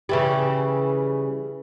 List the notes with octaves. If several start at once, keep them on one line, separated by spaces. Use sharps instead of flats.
C#3 E3 G3